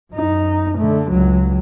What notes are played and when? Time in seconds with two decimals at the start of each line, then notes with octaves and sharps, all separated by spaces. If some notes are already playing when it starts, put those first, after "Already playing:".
0.13 F#2 D#4
0.78 D3 A3
1.11 C#2 F#3